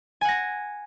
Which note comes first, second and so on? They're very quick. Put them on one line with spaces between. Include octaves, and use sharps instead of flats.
G#5 F#5 A#6